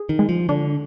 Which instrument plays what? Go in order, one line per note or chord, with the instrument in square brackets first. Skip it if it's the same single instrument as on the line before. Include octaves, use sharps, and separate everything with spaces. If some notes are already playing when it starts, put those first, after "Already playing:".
Already playing: [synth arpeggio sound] G#4
[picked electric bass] D#3
[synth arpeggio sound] G#3
[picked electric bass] F3
[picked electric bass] D3 [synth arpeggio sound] D4